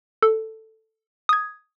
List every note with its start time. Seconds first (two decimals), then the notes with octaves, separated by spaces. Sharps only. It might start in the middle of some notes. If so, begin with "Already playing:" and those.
0.23 A4
1.29 D#6 G#6